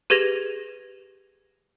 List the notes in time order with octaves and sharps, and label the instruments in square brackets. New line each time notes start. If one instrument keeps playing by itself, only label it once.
[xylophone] G4 G#4 B4 G#6 A#6 F7